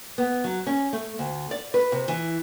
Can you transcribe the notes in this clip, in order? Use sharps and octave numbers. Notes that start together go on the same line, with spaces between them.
B3
F#3
C#4
A3
D2
D5
B4
C3
E3